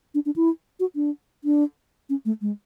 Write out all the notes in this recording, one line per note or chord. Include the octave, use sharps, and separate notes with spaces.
D4
D4
E4
F#4
D4
D4
C#4
A3
G#3